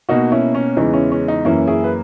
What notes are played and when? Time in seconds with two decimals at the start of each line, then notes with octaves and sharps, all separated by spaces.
0.09 B2 A#3 D#4 F#4
0.32 C#4 E4
0.55 C#4
0.77 E2 C#3 E3 G#3 D#4
0.94 C#4 E4
1.12 C#4
1.28 D#4
1.45 F#2 E3 A#3 C#4 E4
1.67 E4 G#4
1.84 B4